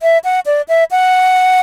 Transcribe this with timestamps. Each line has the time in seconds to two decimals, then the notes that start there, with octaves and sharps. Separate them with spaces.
0.02 E5
0.24 F#5
0.46 D5
0.68 E5
0.91 F#5